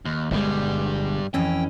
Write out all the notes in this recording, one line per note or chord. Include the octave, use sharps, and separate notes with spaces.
D#2
G1 G2 B2 G3 G#3
F2 E3 C#4 G5